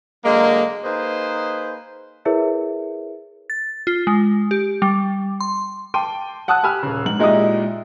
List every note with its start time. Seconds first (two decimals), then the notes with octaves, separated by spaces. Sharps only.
0.24 D3 F#3 G#3 A#3
0.85 A#3 D#4 G#4 B4 C5
2.25 E4 G#4 A#4 B4 C#5 E5
3.50 A6
3.87 F4
4.07 G#3
4.51 G4
4.82 G3
5.41 C6
5.94 G5 A5 C6 D6 D#7
6.48 F#5 A5 D#6 E6 F#6
6.63 G4 G#5 B5 E6 F6
6.83 D#1 C#3
7.06 G#2 F#7
7.19 A#2 G#3 D#4 E4 G4 D#6